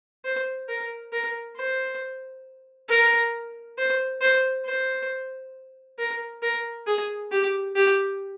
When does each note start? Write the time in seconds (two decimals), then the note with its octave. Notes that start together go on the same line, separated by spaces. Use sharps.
0.25 C5
0.69 A#4
1.12 A#4
1.57 C5
2.89 A#4
3.78 C5
4.21 C5
4.65 C5
5.99 A#4
6.42 A#4
6.87 G#4
7.31 G4
7.76 G4